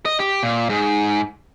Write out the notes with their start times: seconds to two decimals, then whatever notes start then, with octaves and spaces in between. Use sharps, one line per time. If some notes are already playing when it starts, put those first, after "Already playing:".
0.05 D#5
0.20 G4
0.43 A#2
0.69 G#2